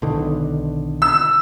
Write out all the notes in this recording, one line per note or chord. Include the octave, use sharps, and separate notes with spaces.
B1 D3 D#3
E6